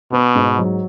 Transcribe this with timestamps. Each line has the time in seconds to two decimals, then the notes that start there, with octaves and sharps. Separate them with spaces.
0.12 B2 B3
0.35 G#2
0.59 F#3